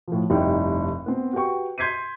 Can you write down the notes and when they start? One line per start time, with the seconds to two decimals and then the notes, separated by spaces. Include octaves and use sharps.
0.08 A2 F3
0.30 F1 G2 D#4 E4 G5
1.06 B3 C4
1.33 F#4 G4 B4 G5 C#6
1.78 C6 G6 G#6 B6 C7 D#7